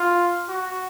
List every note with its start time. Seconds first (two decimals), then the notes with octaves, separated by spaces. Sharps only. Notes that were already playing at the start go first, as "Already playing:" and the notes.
Already playing: F4
0.48 F#4